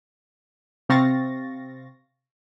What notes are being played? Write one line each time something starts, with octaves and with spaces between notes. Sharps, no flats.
C3 C4 F5 C#6 A6 A#6